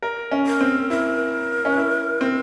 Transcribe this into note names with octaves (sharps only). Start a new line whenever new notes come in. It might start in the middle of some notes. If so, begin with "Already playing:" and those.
A#4
C#4
A#4
C4
E4 A#4
C#4
E4
C4